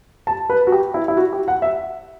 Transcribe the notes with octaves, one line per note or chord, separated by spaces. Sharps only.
A5
B4
F#4
G4
E4
E4
F#4
G4
F#5
E5